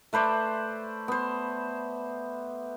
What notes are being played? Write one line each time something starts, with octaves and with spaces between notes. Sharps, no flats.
A3 B4 C5 D5
B3 C5